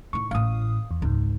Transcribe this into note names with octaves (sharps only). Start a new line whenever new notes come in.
A2 D#4 C#6
A1 A2 F5 D#6
E2
G#1 C#2 G#2 D#4